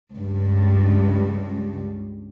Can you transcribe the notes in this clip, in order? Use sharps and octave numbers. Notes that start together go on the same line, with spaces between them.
C#2 G2